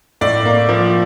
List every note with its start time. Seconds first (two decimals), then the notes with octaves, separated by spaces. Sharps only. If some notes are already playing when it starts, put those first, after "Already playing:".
0.21 A2 D5
0.45 A#3
0.69 F3